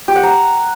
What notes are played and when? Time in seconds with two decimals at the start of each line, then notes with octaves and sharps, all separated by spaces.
0.08 G4
0.16 F#5
0.23 A#5